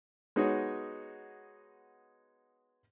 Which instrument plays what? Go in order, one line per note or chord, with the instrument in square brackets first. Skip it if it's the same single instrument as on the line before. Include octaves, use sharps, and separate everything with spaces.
[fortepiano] G#3 B3 D#4 F#4 G#4 C#5